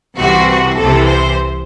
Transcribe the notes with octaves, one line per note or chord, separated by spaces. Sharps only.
C2 C3 E3 F#4
F#4
C2 C3 E3 A4
C5